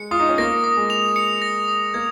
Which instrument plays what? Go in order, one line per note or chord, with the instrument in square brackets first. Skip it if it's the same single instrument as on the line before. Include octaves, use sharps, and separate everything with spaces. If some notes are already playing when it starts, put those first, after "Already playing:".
Already playing: [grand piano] G#3 [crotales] C#7
[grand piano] F4 [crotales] D#6
[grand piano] D#4
C#4
[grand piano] A#3 [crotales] A#6
[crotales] D#6
[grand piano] G#3
[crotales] F7
C#7
A#6
D#6
[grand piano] A#3 [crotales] G#6